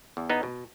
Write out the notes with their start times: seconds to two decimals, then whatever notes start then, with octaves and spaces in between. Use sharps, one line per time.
0.17 E2
0.30 B3 D#4
0.43 B2